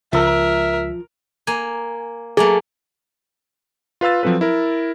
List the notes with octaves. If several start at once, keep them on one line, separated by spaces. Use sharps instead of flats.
C#2 F3 A#4 E5 E6
A#3 G#5
F#3 A3 A#3 G#4
F4 B4 F5 E6 A6
F3 F#3 C4 A4 B4
E4 A#4